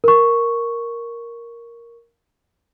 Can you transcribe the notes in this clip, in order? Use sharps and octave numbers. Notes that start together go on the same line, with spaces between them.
A#4 C#6